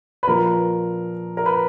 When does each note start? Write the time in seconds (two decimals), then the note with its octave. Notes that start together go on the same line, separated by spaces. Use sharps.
0.23 B4
0.28 A#2 F3 A#4
1.37 A#4
1.46 B4